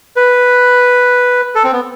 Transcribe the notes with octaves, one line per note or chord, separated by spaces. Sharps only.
B4
A4
C4
B3